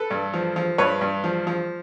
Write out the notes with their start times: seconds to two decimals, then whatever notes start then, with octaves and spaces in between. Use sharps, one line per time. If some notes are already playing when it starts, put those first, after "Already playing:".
Already playing: A4 B4
0.10 G2
0.33 F3
0.56 F3
0.78 G2 B4 C#5
1.01 G2
1.24 F3
1.47 F3